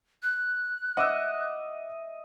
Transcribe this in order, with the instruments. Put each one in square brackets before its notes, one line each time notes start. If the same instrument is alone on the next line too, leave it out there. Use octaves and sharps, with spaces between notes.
[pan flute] F#6
[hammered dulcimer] D#5 E5 [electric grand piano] F#5 D6 E6